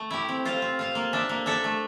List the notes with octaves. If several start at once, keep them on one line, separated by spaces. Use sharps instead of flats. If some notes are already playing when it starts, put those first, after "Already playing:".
Already playing: A3
E4 G4
C4
F4 C5 F5
C4
F4 C5 F5
A#3
D4 A4 E5
A#3
D4 A4 E5
A3